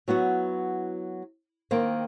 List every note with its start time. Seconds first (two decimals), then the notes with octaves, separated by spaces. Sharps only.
0.08 F#3 B3 E4 F#4
1.71 D#3 A#3 C4